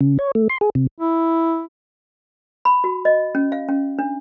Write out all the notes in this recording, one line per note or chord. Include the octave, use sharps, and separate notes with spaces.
C#3
C#5
A3
C6
G#4
C3
E4
B5
F#4
D#5
C#4
F5
C#4
D4